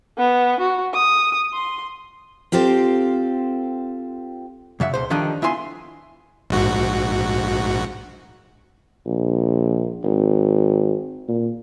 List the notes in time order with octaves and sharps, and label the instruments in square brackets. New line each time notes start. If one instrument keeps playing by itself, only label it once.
[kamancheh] B3
F#4
D#6
C6
[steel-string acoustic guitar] C4 F4 G4 A4 C5
[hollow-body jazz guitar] F#2 C#3 E5 F#5
C#2 B2 C5
D3 D#3 F3 G3 D4 D#4
B3 E4 F4 G#5 C6
[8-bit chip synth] A#1 G#2 F#4
[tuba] A#1
G#1
A#2